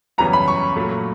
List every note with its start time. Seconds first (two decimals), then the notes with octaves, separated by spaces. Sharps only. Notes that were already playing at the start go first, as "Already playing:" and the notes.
0.18 F#2 C#3 E3 G3 B3 A#5
0.33 B5
0.48 C#6
0.76 A#2 F#3 A3